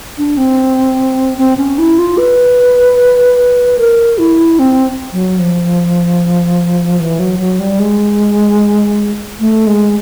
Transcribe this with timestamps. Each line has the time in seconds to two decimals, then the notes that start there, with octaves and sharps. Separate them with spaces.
0.18 D4
0.37 C4
1.38 C4
1.57 C#4
1.78 E4
1.98 F4
2.18 B4
3.79 A#4
4.18 E4
4.59 C4
5.13 F#3
5.39 F3
7.00 E3
7.19 F#3
7.39 F#3
7.60 G3
7.79 G#3
9.40 A3
9.67 G#3